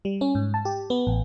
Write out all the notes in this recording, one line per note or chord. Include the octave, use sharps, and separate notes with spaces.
G3
C#4
G#2
A5
G4
B3
A1